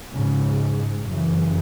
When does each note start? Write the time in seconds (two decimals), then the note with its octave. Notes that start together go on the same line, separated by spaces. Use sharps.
0.15 G#2 C#3
1.08 F#2 C#3 E3